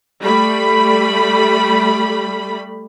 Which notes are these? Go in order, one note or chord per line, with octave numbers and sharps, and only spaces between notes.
G3 A3 B5